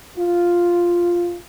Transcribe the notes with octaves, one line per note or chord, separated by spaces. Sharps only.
F4